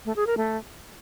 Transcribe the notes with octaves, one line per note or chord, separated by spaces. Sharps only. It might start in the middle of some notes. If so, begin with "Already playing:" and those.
A3
G#4
A#4
A3